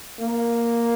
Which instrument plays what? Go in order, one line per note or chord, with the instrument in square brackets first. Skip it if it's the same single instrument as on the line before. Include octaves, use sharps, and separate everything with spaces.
[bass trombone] A#3